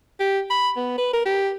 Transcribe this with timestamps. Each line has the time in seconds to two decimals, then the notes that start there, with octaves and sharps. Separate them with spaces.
0.20 G4
0.50 B5
0.76 B3
0.98 B4
1.13 A#4
1.26 G4